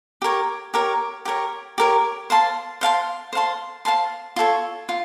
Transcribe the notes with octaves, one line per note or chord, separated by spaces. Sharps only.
G4 A#4 C#5
G4 A#4 C#5
G4 A#4 C#5
G4 A#4 C#5
C5 F5 A5 C6
C5 F5 A5 C6
C5 F5 A5 C6
C5 F5 A5 C6
F4 A4 C#5
F4